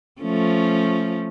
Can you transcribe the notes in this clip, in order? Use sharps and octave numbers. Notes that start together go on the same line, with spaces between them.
F3 A3 C#4